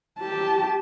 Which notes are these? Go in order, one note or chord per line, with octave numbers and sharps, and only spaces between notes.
G4 A5